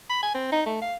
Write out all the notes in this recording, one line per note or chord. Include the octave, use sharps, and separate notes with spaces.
B5
G#5
C4
D#4
A3
F5